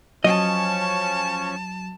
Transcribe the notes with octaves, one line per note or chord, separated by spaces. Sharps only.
F3 F#3 C#4 D#5 A5 C#6